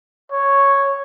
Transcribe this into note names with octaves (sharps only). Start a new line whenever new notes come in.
C#5